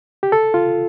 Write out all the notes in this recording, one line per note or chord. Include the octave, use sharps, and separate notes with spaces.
G4
A4
F4